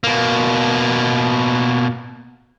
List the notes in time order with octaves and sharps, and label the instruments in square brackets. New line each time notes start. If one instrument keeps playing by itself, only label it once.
[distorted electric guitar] B2 A#3